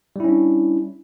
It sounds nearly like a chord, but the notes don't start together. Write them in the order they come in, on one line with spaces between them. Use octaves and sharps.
G3 E4 C#4 D4